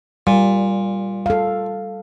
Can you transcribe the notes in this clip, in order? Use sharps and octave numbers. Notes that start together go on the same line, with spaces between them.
A#2 G3
A4 F5